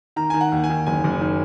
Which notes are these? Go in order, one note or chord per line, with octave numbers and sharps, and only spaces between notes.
D#3 A#5
D#3 G#5
F#5
D#2
G#5
D#3
F#1 G#5
F#1
D#3